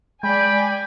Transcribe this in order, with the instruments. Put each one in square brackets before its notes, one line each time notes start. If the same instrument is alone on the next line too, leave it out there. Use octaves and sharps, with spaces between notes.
[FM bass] G#3 [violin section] D5 G#5 [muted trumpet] G5 [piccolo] B5